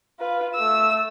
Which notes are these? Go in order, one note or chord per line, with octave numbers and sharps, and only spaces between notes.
F4 B4
A3 E6